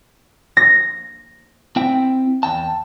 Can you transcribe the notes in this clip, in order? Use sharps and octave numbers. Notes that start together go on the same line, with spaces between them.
A#6
C4 E4 G5
E2 G5 A5